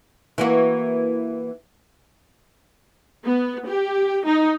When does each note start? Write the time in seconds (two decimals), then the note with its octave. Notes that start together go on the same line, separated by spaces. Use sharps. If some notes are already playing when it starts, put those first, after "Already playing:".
0.38 E3 A#3 F#4
3.25 B3
3.68 G4
4.26 D#4